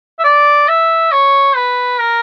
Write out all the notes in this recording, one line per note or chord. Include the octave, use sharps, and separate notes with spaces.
E5
D5
E5
C#5
B4
A#4